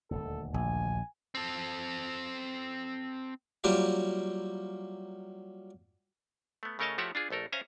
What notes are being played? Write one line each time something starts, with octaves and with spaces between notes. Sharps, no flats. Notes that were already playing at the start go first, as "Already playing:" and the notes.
D#1 G#1 D2 A4
A#1 G#5
C4 A4
F#3 G3 A#3 E4 F4 G4
A3 B3
C#3 A3 A#4 C#5 D#5 A5
F3 A3 F#4 G4 C#5 E5
D4 F4 G#4
A#1 A3 A4 A#4
C#4 C5 E5 F5 G#5 A#5